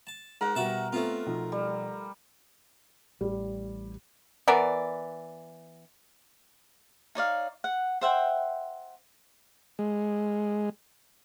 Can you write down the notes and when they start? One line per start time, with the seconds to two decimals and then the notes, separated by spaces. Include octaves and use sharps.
0.07 A5
0.41 G#2 A#4 F#5
0.55 B2 G3 F#4 E5 A5
0.93 A3 B3 C4 F4
1.26 B1 F3
1.52 G3
3.21 A1 G3
4.48 E3 B3 A#4 D5
7.15 D#4 C#5 D5 F5
7.64 F#5
8.01 C5 E5 F#5 G5
9.79 G#3